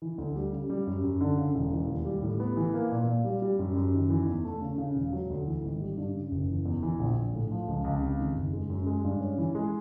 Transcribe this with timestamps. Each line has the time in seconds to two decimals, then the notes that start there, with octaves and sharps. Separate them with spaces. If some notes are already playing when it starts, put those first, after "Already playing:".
0.02 E3
0.18 D2
0.36 G3
0.53 C#3
0.70 G3
0.87 F#2
1.04 F#2
1.21 D3
1.37 C#3
1.54 E1
1.72 E3
1.88 D#2
2.05 G3
2.22 A2
2.40 B3
2.57 E3
2.74 A#3
2.92 A#2
3.08 A#2
3.25 G3
3.42 G3
3.59 F#2
3.76 F#2
3.94 D#3
4.10 E3
4.27 E2
4.45 A3
4.61 C#3
4.78 C#3
4.95 E1
5.13 F#3
5.30 D2
5.47 E3
5.64 G#1
5.81 G3
5.97 G2
6.15 C#3
6.31 F#1
6.49 E3
6.65 E2
6.83 E3
6.99 A#1
7.16 A#1
7.33 A2
7.51 F3
7.68 C#2
7.84 C#2
8.01 C3
8.19 D#3
8.36 F#1
8.53 G#3
8.70 F#2
8.86 G#3
9.04 G2
9.21 C#4
9.38 E3
9.55 G#3